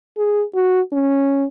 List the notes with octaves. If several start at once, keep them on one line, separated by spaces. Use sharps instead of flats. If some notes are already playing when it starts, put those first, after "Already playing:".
G#4
F#4
C#4